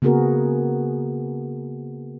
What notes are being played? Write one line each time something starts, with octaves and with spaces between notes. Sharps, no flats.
C#3 A#3 B3 F#4 G#4 A#4